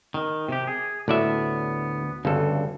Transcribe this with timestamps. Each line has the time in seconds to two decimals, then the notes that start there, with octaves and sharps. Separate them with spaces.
0.14 D#3
0.49 C3 G4
0.67 G#4
1.08 D2 A2 B3 D5 E5
2.25 G1 D2 G2 C#3 A4